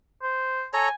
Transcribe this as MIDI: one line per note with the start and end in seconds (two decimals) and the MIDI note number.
0.22 0.64 72
0.73 0.88 69
0.73 0.88 73
0.73 0.93 80
0.73 0.88 82